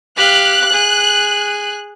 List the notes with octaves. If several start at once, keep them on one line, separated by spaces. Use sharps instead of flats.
G4 F5 F#6
G#4